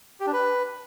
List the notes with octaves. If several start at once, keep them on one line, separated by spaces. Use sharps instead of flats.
G4
D4
B4